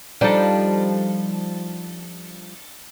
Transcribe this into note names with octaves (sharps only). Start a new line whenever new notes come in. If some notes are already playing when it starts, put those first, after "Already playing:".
F3 G3 D4 D#4 A4